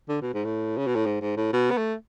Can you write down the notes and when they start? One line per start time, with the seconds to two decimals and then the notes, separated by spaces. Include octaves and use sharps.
0.09 D3
0.22 B2
0.34 G#2
0.45 A2
0.77 C#3
0.87 B2
0.95 A2
1.06 G#2
1.21 G#2
1.37 A2
1.53 B2
1.71 B3
1.77 A3